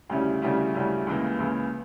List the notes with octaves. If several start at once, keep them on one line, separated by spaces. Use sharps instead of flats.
D2 C#3 G3 C#4 E4
D2 C#3 G3 C#4 E4
D2 C#3 G3 C#4 E4
C#2 C#3 E3 A#3
C#2 C#3 E3 A#3